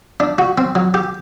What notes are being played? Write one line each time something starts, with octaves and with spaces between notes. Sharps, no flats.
D4
F#4
C4
F#3
G4